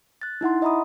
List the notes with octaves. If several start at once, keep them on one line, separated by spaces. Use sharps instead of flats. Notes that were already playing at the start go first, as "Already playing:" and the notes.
F#6 A6
D#4 E4 F#5 C6
D#5 E5 A#5 B5 D#6